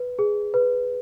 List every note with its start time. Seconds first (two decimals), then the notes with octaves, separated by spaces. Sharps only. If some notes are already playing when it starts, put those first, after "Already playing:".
Already playing: B4
0.19 G#4
0.54 B4